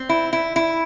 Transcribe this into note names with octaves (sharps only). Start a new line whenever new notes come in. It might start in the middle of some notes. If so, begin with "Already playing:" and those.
Already playing: C4
E4
E4
E4